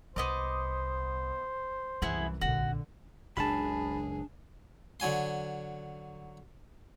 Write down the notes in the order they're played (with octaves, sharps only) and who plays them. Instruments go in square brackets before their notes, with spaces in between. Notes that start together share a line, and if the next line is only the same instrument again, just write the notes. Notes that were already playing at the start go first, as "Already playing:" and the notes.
[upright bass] C2 [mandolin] B3 D#5 D6 [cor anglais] C5
[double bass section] C2 F#2 E3 [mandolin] B3 E4 G#4 [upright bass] C#4
[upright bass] D1 A#1 [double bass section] D3 [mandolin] F#4
[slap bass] F#1 C#2 [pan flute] D4 [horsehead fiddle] G#4 [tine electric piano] A5 B5
[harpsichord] D3 F#3 G#5 C6